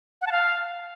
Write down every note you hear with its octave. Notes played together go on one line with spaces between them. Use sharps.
F#5
A5
F5